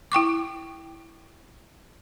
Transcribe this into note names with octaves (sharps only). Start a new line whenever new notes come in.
E4 G5 C#6 D6